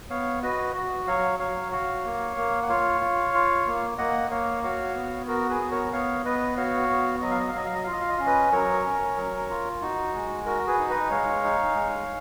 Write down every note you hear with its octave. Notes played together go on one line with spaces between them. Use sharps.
B3 C#5 F5
F#4 B4 D#5
F#4
F#3 C#5 F5
F#3 C#5 F5
F#4 C#5 F5
A#3
A#3
F#5
F4 C#5 F5
F4
F4
A#3
A#3 D#5 F#5
A#3 C#5 F5
F#4 C#5 F5
B3
F#4 A#4
G#4 B4
B3
A#4 C#5
B3 C#5 F5
B3 B4 D#5
F#4 C#5 F5
B3
F#3 D#5
F5
D#5
F5
F#3 D#5
F5
D#5
F4 F5
D#5
F5
D#5
C#4 F5
B4 D#5
F#3 A#4 C#5
C#4
F#3
F4
D#4 F#4
G#3
F#4 A#4
G#4 B4
D#4
B4 D#5
D#5
G#3 C#5 F5
D#4
G#3